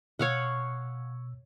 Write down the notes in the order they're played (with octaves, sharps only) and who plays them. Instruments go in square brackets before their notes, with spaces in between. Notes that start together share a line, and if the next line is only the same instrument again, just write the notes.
[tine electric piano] B2 E6 [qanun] C#5 F5 F#5